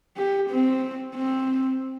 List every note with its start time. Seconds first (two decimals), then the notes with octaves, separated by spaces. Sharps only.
0.17 G4
0.50 C4
1.15 C4